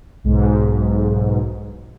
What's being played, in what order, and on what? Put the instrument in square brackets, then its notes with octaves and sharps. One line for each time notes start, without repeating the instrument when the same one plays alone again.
[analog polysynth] B1 G#2